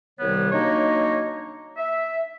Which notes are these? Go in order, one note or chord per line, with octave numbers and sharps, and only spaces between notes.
C2 C3 D#3 G3 B3 C#5
F#3 A#3 D4 D#4 C#5 D#5
E5